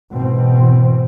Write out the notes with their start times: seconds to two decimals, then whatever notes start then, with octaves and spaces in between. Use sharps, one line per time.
0.14 G#2 B2 E3 C4